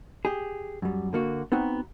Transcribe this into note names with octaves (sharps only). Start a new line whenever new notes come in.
G4 G#4
F#2 G3
D3 A#3 F#4
B3 C4 D#4 F#4 C5